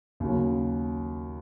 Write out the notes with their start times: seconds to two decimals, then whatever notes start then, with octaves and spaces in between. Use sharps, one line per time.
0.20 D#2 C#3 F#3